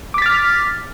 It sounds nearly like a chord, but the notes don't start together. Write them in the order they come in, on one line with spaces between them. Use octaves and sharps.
D6 B6 A6 F6